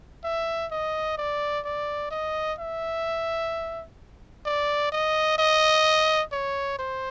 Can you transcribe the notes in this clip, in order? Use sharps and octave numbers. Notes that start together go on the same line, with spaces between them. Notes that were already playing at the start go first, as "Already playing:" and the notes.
E5
D#5
D5
D5
D#5
E5
D5
D#5
D#5
C#5
C5